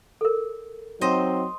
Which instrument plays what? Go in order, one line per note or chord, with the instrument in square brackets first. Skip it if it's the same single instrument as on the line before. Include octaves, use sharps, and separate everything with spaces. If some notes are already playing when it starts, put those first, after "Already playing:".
[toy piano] A4 A#4
[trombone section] F#3 C4 D#4 [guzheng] C5 D#5